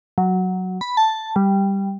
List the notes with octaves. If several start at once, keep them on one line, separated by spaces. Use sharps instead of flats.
F#3
B5
A5
G3